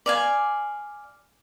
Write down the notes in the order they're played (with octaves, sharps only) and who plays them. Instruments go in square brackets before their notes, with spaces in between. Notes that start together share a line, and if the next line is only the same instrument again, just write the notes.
[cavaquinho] D5 F5 G#5